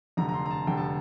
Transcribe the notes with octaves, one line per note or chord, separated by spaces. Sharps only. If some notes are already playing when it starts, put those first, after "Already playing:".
F1 F2 D3 A#5
A#5
C6
A#5
A5
F1 F2 D3 G5
A5